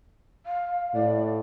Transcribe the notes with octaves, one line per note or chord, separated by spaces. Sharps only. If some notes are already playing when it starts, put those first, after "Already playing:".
F5
A2 D5